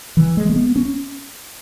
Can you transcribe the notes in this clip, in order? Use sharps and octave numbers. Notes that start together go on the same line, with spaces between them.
E3
G#3
A3
B3
C#4